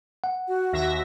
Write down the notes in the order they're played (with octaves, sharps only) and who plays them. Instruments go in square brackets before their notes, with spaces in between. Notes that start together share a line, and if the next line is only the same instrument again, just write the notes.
[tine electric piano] F#5
[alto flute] F#4
[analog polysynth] D#2 E5 A#6